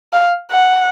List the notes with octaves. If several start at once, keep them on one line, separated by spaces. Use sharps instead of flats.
F5
F#5